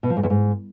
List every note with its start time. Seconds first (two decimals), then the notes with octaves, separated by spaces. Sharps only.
0.03 B2
0.10 F3
0.17 G#2
0.23 E2
0.30 G#2